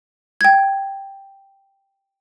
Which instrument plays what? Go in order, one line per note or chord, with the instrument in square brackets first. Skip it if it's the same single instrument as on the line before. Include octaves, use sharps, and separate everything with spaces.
[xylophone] G5 G#6